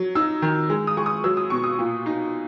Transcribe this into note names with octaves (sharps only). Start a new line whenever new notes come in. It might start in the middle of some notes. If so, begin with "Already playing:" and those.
Already playing: F#3
D#4 E6
D#3
G#3
D#6
G#3 C#6
D#6
F#3 E6
D#6
B2 C#6
D#6
A#2
D#4